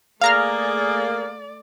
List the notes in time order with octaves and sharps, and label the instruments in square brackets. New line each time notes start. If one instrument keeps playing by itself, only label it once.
[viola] A3 D5 [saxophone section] A#3 G#4 [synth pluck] F5 A#5 F6